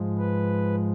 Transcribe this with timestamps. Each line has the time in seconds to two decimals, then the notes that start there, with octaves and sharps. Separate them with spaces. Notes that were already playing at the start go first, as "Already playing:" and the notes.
Already playing: G#2 F3 G#3
0.18 B4